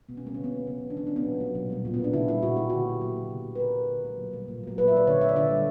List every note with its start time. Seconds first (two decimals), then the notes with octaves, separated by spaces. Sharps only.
0.09 B2 B3
0.17 C#4
0.24 G3 A#3 B3
0.34 D3 C#4
0.44 B3
0.52 F#3 A#3
0.67 C#3 B3
0.82 E3 A#3
0.90 D4
0.96 C#3 C#4
1.07 D4
1.12 F#3 A#3 B3
1.26 A#2
1.40 F#3 A#3
1.55 B2
1.70 G3 A#3
1.85 A#2
1.94 B3
1.99 A#3 D4
2.13 C#3 E4
2.28 G3 A#3 E4
2.42 A#2 F#4
2.57 A#3 G4
2.70 D3 F#4
2.87 F#3 A#3
3.01 A#2 G4
3.16 F#3 A#3
3.30 C#3
3.46 G3 A#3
3.55 B4
3.60 A#2 A#4
3.75 A#3
3.90 D3
4.04 F#3 A#3
4.19 B2
4.33 G3 A#3
4.48 A#2
4.63 F#3 A#3
4.78 A#2 B4
4.88 E5
4.92 A#3 D5
5.07 D3 C#5
5.21 A#3 E5
5.29 D5
5.36 D3 E5
5.50 G3 A#3